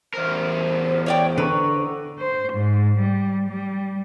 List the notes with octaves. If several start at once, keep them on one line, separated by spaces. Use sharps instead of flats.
E2 A#4 C5
C#5 D5 G5
D3 B4 A#5 C#6
C5
G#2
G3
G3